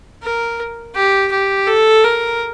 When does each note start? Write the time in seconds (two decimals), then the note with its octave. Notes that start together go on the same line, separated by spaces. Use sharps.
0.23 A#4
0.95 G4
1.31 G4
1.67 A4
2.04 A#4